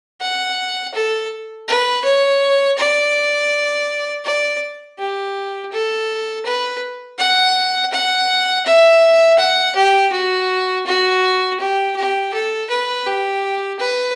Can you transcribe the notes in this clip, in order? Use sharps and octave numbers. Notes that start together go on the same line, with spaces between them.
F#5
A4
B4
C#5
D5
D5
G4
A4
B4
F#5
F#5
E5
F#5
G4
F#4
F#4
G4
G4
A4
B4
G4
B4